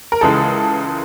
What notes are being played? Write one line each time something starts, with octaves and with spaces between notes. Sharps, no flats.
A#4
C#2 C#3 E3 G#3 A4